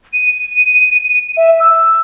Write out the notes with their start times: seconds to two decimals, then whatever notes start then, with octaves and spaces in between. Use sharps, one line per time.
0.13 D#7
1.37 E5
1.60 E6